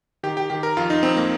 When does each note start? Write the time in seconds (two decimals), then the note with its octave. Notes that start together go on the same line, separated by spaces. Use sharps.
0.23 D#3 G4
0.37 G4
0.50 D#3 G4
0.63 A#4
0.77 F2 F4
0.90 D#4
1.03 F2 C4
1.17 A#3